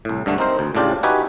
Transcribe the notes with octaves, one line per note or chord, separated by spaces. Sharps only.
C2 A2
G2 D3 A3
C4 D#4 A#4 C5
D2
A2 C#3 D4 F4 G4
D#4 F#4 G4 B4 E5 G#5